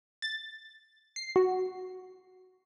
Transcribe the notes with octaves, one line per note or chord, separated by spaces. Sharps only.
A6
C7
F#4